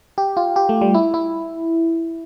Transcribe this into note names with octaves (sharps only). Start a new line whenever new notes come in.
G4
F4
G4
A3
G3
E4
E4